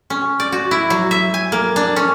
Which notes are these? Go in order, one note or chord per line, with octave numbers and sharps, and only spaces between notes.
C#4
D5
F#4
E4
F#3
E5
G#5
A#3
D4
C#4